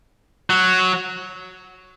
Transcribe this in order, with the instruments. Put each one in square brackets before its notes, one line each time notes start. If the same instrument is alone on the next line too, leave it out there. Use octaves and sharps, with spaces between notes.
[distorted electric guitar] F#3